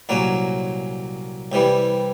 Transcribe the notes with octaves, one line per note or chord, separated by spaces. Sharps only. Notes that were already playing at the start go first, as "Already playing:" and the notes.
C2 A#2 F#3 A#3 C#4
C2 C3 E3 G3